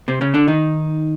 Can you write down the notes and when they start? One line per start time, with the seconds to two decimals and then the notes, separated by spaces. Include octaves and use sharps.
0.08 C3 C4
0.21 C#3 C#4
0.34 D3 D4
0.48 D#3 D#4